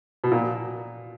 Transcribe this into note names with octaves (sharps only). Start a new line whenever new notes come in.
B2
A#2